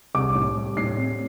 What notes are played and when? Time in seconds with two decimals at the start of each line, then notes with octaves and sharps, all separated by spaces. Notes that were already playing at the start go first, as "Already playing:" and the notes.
0.15 C2 D6
0.35 A2
0.57 G3
0.77 A2 C7
0.98 C4